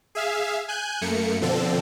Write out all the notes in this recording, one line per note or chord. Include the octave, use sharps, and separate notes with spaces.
G#4 E5 F5
G#5 F#6 G6
F#2 A3 A#3 C#7
B2 D3 F3 C4 A4